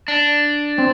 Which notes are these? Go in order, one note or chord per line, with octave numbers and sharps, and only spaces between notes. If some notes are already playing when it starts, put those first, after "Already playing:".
D4
C4